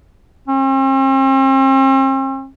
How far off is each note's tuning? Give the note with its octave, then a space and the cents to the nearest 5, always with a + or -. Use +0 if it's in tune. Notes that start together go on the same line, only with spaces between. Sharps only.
C4 +45